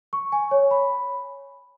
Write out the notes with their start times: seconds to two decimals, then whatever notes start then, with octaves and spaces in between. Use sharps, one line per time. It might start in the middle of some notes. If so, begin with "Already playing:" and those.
0.13 C#6
0.32 G#5
0.51 C#5
0.71 B5